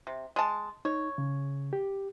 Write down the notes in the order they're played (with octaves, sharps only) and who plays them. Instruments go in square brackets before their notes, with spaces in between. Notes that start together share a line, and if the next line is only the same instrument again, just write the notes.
[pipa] C3
G#3 A5
[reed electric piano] D#4 [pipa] C#5
[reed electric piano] C#3
G4